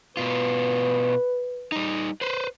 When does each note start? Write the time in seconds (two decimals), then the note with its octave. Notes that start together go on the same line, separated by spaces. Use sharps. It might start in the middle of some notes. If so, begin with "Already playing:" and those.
0.17 B2 F4 B4
1.72 G3 D#4
2.21 B4 C5